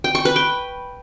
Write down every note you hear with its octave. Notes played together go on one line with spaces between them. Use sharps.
G5
C#6
B4
G5